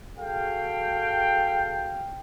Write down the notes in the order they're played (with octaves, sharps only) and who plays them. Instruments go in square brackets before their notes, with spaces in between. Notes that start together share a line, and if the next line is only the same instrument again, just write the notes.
[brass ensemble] F#4 G#4 A4 F5 G5